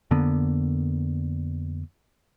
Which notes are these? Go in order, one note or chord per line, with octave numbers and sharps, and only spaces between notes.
F2 D3 A#3 B3